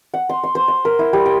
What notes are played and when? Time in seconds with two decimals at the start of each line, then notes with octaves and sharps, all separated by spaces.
0.14 F#5
0.29 C6
0.43 C6
0.55 C5
0.68 C6
0.85 A#4
0.99 E4
1.13 G3
1.26 G5